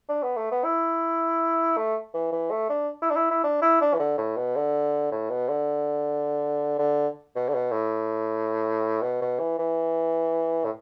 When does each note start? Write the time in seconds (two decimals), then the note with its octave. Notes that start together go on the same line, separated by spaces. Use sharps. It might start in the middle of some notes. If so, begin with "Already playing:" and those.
0.09 D4
0.23 B3
0.37 A3
0.51 B3
0.64 E4
1.77 A3
2.14 E3
2.32 E3
2.51 A3
2.69 D4
3.02 E4
3.10 D4
3.16 E4
3.31 E4
3.44 D4
3.62 E4
3.81 D4
3.94 E3
3.99 D3
4.18 A2
4.36 B2
4.56 D3
5.11 A2
5.30 B2
5.49 D3
6.79 D3
7.35 B2
7.49 D3
7.54 B2
7.72 A2
9.02 B2
9.22 B2
9.39 E3
9.59 E3
10.65 A2